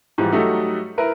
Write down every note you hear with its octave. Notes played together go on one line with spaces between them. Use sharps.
G#2 E3 F3 G3
F#3 G3 A3 D#4 F#4 A4
E4 A#4 B4